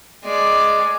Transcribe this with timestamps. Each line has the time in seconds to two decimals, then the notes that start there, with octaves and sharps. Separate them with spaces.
0.25 G#3 D5